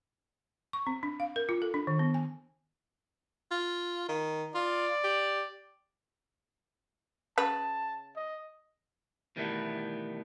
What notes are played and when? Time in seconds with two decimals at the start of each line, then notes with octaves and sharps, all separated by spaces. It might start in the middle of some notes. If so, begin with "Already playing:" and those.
0.73 C#6
0.87 C4
1.03 D4
1.20 F5
1.36 A#4
1.49 F4
1.62 A4
1.74 D4
1.87 D#3
1.99 B3
2.14 G#5
3.51 F4
4.08 D#3
4.55 F4 D5
5.04 G4
7.38 C#3 B4 A5
8.16 D#5
9.36 B2 D#3 E3 G3 A3 B3